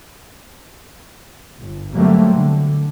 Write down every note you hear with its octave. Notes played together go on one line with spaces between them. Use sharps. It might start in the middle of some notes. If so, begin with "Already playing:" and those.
G1
D3 F#3 G3 A3 A#3 C4
D3